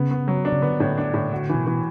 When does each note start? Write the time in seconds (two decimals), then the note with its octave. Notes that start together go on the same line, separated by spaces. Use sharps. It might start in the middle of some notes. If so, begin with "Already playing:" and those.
Already playing: C#3 B3
0.11 B3
0.28 F#3
0.45 D4
0.52 C#3
0.62 D3 B3
0.80 A2
0.98 D4
1.14 A2
1.32 D3 F#4
1.49 E3
1.55 B2
1.66 E3